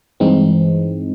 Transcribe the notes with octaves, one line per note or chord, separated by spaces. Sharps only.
G2 E3 G#3 C4 D#4